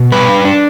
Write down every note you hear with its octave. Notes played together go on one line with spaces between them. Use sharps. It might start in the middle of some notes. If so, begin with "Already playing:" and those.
Already playing: B2
G3 B4
D4
D4